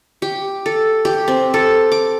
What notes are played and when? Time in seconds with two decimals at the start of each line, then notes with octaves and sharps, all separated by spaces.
0.22 G4
0.66 A4
1.05 G4
1.28 C4
1.54 A4
1.92 D6